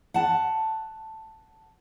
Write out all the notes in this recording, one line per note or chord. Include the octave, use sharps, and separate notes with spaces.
F#5 A5